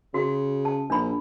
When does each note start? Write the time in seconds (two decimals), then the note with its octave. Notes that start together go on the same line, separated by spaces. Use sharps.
0.14 C#3 F#4
0.65 A5
0.90 A#1 D4 B5